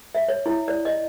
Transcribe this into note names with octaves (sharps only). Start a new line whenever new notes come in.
E5
C#5
E4
D5
D#5